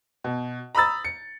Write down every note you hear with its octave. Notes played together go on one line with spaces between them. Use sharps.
B2
A#5 B5 D#6 E6 A6
C#7